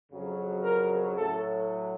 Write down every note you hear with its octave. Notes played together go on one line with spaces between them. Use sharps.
F2 C#3 F#3
A#4
A2 F#3 A4